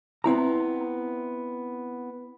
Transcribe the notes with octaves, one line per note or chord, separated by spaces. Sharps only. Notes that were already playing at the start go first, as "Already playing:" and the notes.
B3 C4 E4 A#5